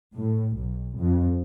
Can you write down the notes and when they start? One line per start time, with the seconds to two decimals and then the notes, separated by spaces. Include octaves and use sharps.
0.15 A2
0.56 B1
0.99 F2